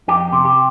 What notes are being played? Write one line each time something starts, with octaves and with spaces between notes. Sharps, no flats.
F2 G4
C3
G4